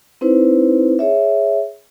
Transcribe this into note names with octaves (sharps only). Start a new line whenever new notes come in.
C4 D#4 E4 B4 C5
G#4 C#5 E5